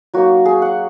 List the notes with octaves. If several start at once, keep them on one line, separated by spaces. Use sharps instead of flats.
F#3 A#3 D#4 F#4
G#4
F#5